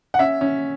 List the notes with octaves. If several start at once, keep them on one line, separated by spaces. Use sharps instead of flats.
F#5
C#4 E5
C#4